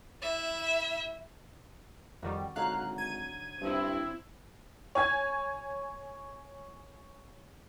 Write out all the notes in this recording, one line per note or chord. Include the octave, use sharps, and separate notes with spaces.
E4 E5
F2 D#3 G3 F#4 D5
G#1 D3 F#3 D#4 F5 F#6
G#6 D#7
G2 C4 E4
C#5 G#5 G#6